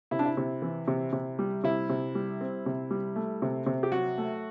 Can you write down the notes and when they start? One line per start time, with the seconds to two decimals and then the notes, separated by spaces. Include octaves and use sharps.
0.11 C3 E4
0.19 D4
0.25 E4
0.37 C3
0.62 E3
0.88 C3
1.13 C3
1.39 G3
1.63 C3 E4
1.89 C3
2.15 G3
2.41 C4
2.66 C3
2.91 G3
3.16 A3
3.42 C3
3.66 C3
3.83 G4
3.92 F#3 F#4
4.18 A3